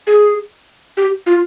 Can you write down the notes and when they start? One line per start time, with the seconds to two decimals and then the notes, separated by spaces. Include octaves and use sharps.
0.07 G#4
0.97 G4
1.26 F4